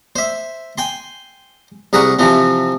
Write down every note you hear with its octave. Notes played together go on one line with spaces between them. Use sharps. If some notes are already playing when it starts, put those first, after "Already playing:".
C5 E5
G5 G#5 C6
C2 G#4 A#4 B4 F#5 C#6
C3 E3 F3 C4